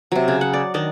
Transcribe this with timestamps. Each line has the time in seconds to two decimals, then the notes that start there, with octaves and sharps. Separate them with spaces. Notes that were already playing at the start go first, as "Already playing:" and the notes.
0.12 C3 F#3
0.28 C#3
0.41 F#5
0.53 D5
0.74 D#3 D4 D5 D#5